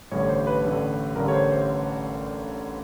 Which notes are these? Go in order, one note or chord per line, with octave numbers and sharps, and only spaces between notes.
A1 G2 D3 G3 C#5
C5
B4
A1 G2 D3 G3
A1 G2 D3 G3 A#4
C#5
C5
C5